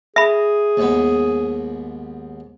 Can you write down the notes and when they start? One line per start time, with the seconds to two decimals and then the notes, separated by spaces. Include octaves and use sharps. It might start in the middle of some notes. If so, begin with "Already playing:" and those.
0.16 G#4 E5 B5
0.77 D#2 G#2 B3